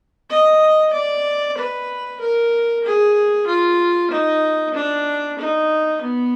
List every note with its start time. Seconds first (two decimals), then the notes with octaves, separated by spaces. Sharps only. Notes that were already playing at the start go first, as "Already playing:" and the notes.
0.30 D#5
0.93 D5
1.58 B4
2.21 A#4
2.84 G#4
3.47 F4
4.11 D#4
4.74 D4
5.39 D#4
6.02 B3